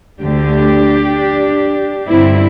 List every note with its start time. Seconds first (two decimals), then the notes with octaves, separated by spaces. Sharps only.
0.21 D2 D3 D4 G4
2.08 G2 D3 C4 E4